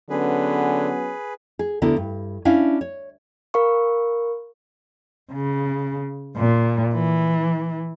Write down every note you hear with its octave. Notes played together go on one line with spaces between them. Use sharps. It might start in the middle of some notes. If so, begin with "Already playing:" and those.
D3 F#3 B3 C#4 G#4 B4
G#4
D2 D3 B3 E4 A#4
G2
C#4 D4 E4 F5
C#5
A#4 F5 B5 C#6
C#3
A#2
E3